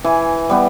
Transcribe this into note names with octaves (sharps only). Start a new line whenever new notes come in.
E3 G#5
G3 B3